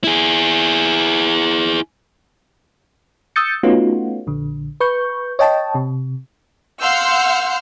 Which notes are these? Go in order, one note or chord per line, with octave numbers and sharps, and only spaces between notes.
E4 G#4
D#6 E6 G6 A6 C#7
A3 B3 C#4 D#4 F4 F#4
A#1 D3
B4 C#6 G6
C#5 D#5 G5 A5
C3
F5 F#5 C6 E6 F6 G6